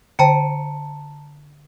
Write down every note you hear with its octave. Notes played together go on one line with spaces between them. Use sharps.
D3 C5 G5 A5 A#5 C#7